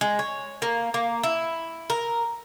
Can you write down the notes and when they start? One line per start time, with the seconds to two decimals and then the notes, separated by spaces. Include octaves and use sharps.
0.01 G#3
0.19 C#5
0.62 A#3
0.94 A#3
1.23 E4
1.90 A#4